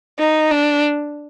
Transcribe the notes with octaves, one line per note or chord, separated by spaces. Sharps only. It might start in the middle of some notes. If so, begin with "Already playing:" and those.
D#4
D4